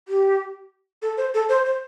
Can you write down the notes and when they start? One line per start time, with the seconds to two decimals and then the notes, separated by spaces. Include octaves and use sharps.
0.08 G4
1.02 A4
1.17 C5
1.34 A4
1.49 C5
1.65 C5